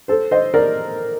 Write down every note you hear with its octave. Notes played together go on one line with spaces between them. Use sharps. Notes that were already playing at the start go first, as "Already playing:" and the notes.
A4 C5
C5 D#5
A#4 D5